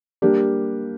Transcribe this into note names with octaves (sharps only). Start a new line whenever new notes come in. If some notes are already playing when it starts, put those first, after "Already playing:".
G3 A#3 D4 G4